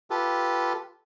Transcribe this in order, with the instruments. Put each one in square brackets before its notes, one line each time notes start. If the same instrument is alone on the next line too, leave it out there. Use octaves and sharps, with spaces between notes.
[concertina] F4 G4 A4 B4